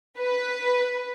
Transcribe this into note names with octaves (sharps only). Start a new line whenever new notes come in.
B4